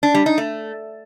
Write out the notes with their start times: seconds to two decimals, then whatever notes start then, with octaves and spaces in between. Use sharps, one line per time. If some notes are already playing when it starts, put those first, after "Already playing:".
0.03 D4
0.14 G3
0.26 D#4
0.38 A3